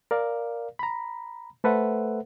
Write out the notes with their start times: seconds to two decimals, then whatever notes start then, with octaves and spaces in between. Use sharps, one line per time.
0.11 A#4 D5 F5
0.79 A#5 B5
1.64 A3 A4 B4 C5 E5 F#5